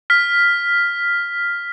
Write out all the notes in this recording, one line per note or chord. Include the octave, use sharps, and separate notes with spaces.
F6 B6